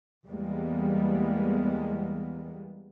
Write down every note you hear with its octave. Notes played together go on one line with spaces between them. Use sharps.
E2 G3 G#3 A#3 B3